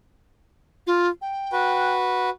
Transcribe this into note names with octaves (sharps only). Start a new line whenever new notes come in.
F4
G5
F#4 B4